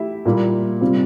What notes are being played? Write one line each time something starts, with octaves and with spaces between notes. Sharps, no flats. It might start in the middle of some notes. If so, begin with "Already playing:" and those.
Already playing: A3 E4 G4 E5
A#2 G3 A#3 E4
C3 G3 C4 F4